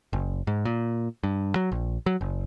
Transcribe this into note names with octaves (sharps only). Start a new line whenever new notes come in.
F#1
G#2
A#2
G2
F#3
A#1
F#3
F#1